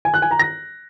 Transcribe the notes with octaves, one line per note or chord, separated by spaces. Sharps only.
G#5
F#6
G#5
A#5
A#6